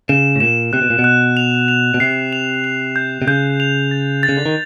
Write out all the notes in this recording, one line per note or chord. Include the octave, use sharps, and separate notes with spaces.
C#3 E7
A2
A#2 E7
C3 F#6
B2
A#2
B2
F#6
F7
F7
B2
C3 C7
F7
F7
G6
C3
C#3 G6
F7
A6
A6
C#3
D3
D#3